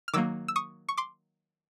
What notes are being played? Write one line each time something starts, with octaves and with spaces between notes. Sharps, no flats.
F6
D#3 F#3 A#3 D6 E6
E6
C#6 D#6
C#6
C6 D6